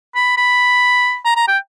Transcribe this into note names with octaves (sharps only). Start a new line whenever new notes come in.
B5
B5
A#5
A#5
G5